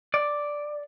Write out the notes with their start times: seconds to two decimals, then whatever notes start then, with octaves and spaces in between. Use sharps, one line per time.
0.14 D5